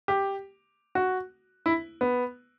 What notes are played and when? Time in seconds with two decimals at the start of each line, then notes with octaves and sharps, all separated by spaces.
0.08 G4
0.95 F#4
1.66 E4
2.01 B3